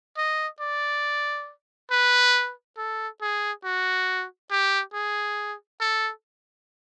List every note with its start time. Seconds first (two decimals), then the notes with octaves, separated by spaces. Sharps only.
0.17 D#5
0.60 D5
1.91 B4
2.77 A4
3.21 G#4
3.64 F#4
4.51 G4
4.94 G#4
5.80 A4